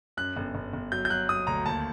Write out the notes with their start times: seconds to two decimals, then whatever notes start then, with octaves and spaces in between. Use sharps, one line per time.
0.17 F#2 F#6
0.37 G1
0.55 G1
0.73 G1
0.92 F#3 G6
1.05 G6
1.10 F#3 F#6
1.29 F#3 D#6
1.47 D2 A#5
1.66 D#2 A5